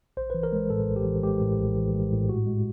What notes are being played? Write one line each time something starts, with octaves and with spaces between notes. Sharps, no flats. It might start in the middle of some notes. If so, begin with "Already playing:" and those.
A#1 C5
E3 B4
A#4
G#3
A2 A4
A#1
G4
E3
G#3 G4
A2
A#1
E3
G#3
A2
G#2 F#4
G#3